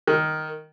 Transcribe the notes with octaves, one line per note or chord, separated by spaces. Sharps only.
D#3